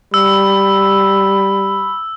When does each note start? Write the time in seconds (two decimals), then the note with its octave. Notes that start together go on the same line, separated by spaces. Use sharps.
0.14 G3 B5 E6